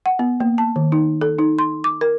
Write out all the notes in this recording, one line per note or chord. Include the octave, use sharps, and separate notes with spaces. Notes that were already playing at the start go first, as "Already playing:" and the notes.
F#5
B3
A#3
A5
D#3
D#4
A4
D#4
C6
D6
A#4